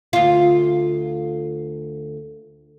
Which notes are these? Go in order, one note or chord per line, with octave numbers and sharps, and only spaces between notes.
D2 F4